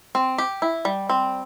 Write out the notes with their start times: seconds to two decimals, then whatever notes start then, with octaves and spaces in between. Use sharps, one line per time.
0.15 C4
0.38 G4
0.62 E4
0.85 G3
1.09 C4